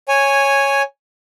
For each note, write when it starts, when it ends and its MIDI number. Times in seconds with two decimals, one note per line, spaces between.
0.08 0.82 73
0.08 0.82 80